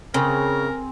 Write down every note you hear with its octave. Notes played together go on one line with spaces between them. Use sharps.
C#3 C4 G#4 A#4